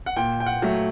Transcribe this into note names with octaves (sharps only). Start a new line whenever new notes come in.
F#5
A#2 G5
G5
F#5
F#3 A3